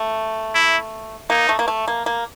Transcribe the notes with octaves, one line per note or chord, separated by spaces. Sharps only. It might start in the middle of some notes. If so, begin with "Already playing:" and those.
Already playing: A3
E4
A#3 D#4
A3
A#3
A3
A#3
A#3